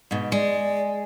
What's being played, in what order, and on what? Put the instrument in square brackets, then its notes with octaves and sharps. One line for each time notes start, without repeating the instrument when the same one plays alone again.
[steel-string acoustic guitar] G#2 B2
[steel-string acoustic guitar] G#3 [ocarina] D5